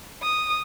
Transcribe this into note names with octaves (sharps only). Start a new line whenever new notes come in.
D#6